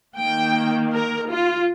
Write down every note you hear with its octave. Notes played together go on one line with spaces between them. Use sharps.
D#3 A#3 G5
A#4
F4